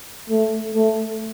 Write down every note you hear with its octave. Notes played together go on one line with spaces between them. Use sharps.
A3
A3